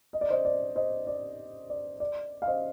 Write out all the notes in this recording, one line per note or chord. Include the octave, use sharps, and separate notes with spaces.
D#5
D5
C5 D#5
D5
C5 D#5
D5
D5
D5
F5
C5 D#5